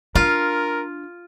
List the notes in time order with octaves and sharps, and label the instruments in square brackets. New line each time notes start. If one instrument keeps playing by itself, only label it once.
[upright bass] D4 [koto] F4 [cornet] A#4